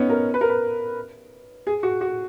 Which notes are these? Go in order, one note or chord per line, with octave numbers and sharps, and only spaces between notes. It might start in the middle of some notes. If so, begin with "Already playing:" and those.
Already playing: B3 C#4 D#4
A#4
B4
A#4
B4
G#4
F#4
F#4